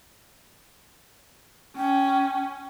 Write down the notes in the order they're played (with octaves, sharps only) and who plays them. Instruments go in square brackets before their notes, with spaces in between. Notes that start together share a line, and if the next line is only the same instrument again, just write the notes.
[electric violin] C#4 [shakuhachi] G5